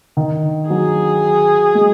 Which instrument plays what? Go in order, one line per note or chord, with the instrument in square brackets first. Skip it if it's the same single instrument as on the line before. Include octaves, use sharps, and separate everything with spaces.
[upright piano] D#3
[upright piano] F#3 [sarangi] G#4
[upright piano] G#3